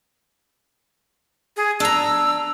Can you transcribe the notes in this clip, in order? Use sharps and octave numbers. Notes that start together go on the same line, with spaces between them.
G#4
D4 A#5 E6